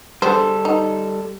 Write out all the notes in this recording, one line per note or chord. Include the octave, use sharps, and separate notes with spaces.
D3 G3 G#3 A4 C5
D#4